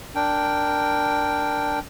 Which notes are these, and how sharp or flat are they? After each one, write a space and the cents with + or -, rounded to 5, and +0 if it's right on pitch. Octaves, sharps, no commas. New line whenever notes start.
D4 +0 A#4 -5 G5 +0